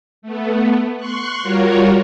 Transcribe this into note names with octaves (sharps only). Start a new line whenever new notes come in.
A3 B3
C6 C#6 F#6
G3 F4 F#4 A#4 C#5